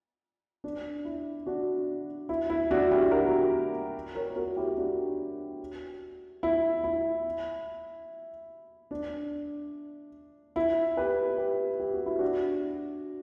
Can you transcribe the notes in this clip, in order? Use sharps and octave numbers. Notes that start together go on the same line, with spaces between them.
D4
E4
D4 F#4
E4
E4
D4 F#4
E4 G4
F#4 A#4
A#4 C#5
F#4 A#4
E4 G4
D4 F#4
E4
E4
D4
E4
G4 B4
G4 B4
G4
F#4
E4
D4 F#4